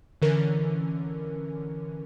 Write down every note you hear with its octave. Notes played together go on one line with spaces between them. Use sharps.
D3 E3 C#4 A#4